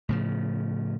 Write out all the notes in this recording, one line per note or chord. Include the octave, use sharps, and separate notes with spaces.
A2 C#3 F3